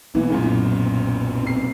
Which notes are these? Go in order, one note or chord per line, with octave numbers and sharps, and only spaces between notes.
B1 E3 A#3 B3
F#2 A#2 C#3
C3 C7